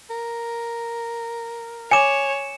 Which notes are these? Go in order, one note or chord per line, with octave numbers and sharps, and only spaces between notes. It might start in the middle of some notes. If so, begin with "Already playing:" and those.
A#4
C#5 G#5 D6 C#7 E7